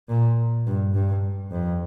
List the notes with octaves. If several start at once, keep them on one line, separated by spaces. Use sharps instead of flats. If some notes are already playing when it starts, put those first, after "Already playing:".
A#2
G2
G2
F2